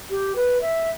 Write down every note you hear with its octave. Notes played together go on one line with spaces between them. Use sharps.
G4
B4
E5